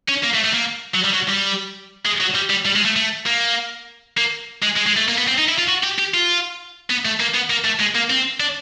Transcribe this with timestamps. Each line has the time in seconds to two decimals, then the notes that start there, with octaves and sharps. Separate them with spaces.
0.08 C#4
0.23 A#3
0.34 A3
0.44 A3
0.53 A#3
0.95 F#3
1.05 G3
1.14 F#3
1.29 G3
2.05 G#3
2.20 F#3
2.35 G3
2.50 G3
2.66 G3
2.76 G#3
2.85 A3
2.96 A3
3.26 A#3
4.18 A#3
4.63 G#3
4.77 G#3
4.87 G#3
4.97 A3
5.08 A#3
5.18 B3
5.28 C4
5.38 D#4
5.48 E4
5.58 F4
5.68 F#4
5.83 G4
5.98 G4
6.14 F4
6.90 B3
7.05 A3
7.20 A#3
7.34 B3
7.50 A#3
7.65 A3
7.80 G#3
7.95 A#3
8.10 C4
8.40 D4